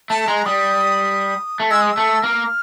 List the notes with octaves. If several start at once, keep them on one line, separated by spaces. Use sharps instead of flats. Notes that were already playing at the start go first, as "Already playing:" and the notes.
A3 A5
G#3 A#5
G3 D#6
A3
G#3 E6
D#6
A3 E6
A#3 F6